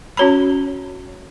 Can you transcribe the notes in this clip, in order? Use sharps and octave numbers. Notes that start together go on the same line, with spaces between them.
C#4 F#4 C#5 A#5 B5